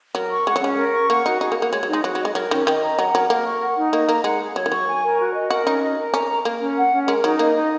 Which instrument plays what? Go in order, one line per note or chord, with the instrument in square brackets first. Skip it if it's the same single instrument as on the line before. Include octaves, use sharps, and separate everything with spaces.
[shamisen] F#3 [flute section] A#4
[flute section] C#6
[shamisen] G#3 [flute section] F#5
[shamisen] F#3
[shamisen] G#3 [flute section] C#4
[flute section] A#4
C#6
[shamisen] A#3 [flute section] F#5
[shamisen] D#4 [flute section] F#4
[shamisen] D#4 [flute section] G#4
[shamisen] A#3
[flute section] F#5
[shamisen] A#3
[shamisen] G#3 [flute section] C#5
[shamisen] F#3
[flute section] D#4
[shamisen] G#3
[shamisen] F#3 [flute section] F#4
[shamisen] F#3
[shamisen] G#3 [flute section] D#5
[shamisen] F#3 [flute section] A#4
[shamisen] D#3 [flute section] C#4
[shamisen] D#3 [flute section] D#5
[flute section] A#5
[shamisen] F#3 [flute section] F#5
[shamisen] F#3 [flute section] A#4
[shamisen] A#3 [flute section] A#4
[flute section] C#6
F#5
D#4
[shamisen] A#3 [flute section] D#5
[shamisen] A#3 [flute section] A#5
[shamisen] G#3 [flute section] F#5
[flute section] G#4
[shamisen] F#3 [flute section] C#5
[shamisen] D#3
[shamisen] F#3 [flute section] C#6
[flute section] G#5
A#4
F#4
D#5
[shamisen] F#4 [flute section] A#4
[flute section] C#4 [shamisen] D#4
[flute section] D#5
A#4
[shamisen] C#4 [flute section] A#5
[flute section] A#4
[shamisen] A#3 [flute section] A#4
[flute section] C#4
F#5
C#4
[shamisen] G#3 [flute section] A#4
[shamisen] F#3 [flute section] D#4
[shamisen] A#3 [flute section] D#5
[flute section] D#4